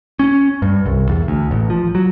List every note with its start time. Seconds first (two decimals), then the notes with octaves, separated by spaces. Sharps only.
0.19 C#4
0.62 G2
0.86 C2
1.09 E2
1.28 D2
1.51 A1
1.70 F3
1.95 F#3